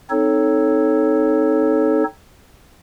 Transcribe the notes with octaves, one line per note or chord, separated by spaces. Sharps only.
C4 D#4 A4 C#5